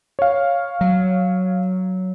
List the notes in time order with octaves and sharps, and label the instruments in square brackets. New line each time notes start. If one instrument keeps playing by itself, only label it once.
[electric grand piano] C#5 F5
[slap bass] F#3